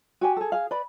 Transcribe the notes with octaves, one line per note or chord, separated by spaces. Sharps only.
F#4 G4 G#5
G#4 A4
G#4 F5
B4 D5 B5